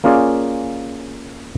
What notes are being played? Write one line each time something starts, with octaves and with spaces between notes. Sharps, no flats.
A#3 C#4 F4 G#4 D5 F5